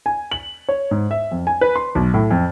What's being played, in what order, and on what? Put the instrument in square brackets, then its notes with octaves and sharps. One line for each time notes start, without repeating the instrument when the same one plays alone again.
[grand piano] G#5
F#7
C#5
G#2
E5
F2
G#5
B4
C6
B1
A2
F2